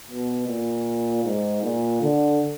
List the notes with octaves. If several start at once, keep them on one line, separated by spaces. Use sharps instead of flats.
B2
A#2
G#2
A#2
D3